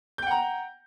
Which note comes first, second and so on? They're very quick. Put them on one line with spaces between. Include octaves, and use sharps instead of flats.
G6 G5 F#5 A#5